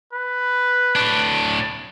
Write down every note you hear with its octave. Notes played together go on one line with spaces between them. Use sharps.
B4
A2 D4